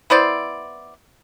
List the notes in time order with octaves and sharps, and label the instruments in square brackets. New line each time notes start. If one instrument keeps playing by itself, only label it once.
[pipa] B3 E4 C5 D5